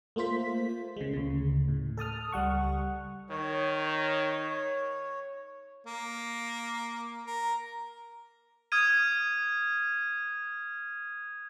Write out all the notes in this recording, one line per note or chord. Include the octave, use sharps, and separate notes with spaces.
A3 A#3 F4 C5 B6
C#3 G#3
D2 C#3
A2
A4 A5 D#6 F6
C#2 G3 F#5 C#6
D#3 C#5
A#3
A#4
D#6 F6 G#6 D#7